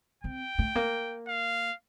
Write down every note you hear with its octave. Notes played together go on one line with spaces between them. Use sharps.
C4 G5
A3
A#3
F5